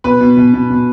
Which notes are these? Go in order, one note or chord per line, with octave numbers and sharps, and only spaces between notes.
B2 B4 B5
B2
B2
B2
B2